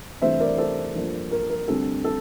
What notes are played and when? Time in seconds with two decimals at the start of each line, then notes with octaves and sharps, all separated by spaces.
0.22 C2 C3 E3 A3 D4 C5 E5
0.40 A#4 D5
0.58 A4 C5
0.95 G2 F3 A#3 D4
1.31 A#4
1.50 A#4
1.68 D2 C3 G3 C4 A4
2.04 A4